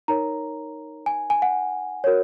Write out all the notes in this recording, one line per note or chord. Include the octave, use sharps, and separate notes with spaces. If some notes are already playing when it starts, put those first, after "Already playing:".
D#4 A#4 C#5 A#5
G#5
G#5
F#5
F#4 A#4 C#5